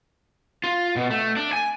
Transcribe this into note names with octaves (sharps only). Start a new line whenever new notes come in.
F4
B2
A3
D4
G#5